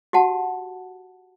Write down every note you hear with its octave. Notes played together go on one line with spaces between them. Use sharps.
F#4 G4 F#5 A5